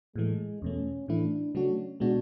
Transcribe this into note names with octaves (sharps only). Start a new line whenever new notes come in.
A2 E3 G#3 A3
E2 B2 A3 C#4
A2 E3 A3 D4 E4
C#3 F#3 A3 C#4 D4 F#4
B2 G#3 B3 D4 F#4